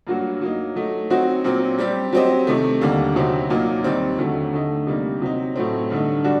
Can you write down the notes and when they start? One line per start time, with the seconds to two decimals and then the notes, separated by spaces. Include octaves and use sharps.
0.07 G2 F#3 A#3 F#4
0.41 F#3 A#3 D#4
0.76 F#3 A3 D#4
1.10 F#3 C4 D#4 F#4
1.44 A#2 F#3 C4
1.79 G3 C4 G4
2.13 F#3 C4 G4 C5 D#5
2.47 C3 D#3 A3
2.81 D#2 D3 G3 A#3
3.16 D2 C3 D#3 F#3 C4
3.50 A#2 F#3 A#3 D#4
3.84 D#2 D#3 G3 C4
4.18 D#2 D3 F#3 A3
4.53 D3 A3 D#4
4.87 C3 G3 A#3 D#4
5.22 C3 F#3 C4 D#4
5.56 A2 F#3 A3 C4
5.90 G2 D3 A3 D#4
6.24 G3 D4 F#4